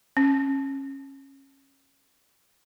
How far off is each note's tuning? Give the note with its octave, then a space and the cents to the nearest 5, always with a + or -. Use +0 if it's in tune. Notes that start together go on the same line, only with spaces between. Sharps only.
C#4 -25